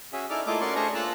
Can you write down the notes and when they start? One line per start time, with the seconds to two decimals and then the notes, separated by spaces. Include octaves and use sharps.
0.13 C#4 F#4 G#4 E5
0.30 D#4 E4 A4 D5 D6 F6
0.47 A3 A#3 E4 F4 D#5 D6
0.61 C#4 F#4 A#4 D5 C6 C#6
0.75 A3 D4 G#4 C5 A#5 C#6
0.95 A#3 F4 A5 A#5 E6 F#6